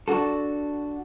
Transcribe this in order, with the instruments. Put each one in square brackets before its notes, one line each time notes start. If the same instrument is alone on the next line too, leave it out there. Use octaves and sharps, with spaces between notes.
[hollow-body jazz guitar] D4 F#4 A4